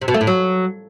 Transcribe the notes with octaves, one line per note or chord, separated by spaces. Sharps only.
C3
B2
A3
A2
F#3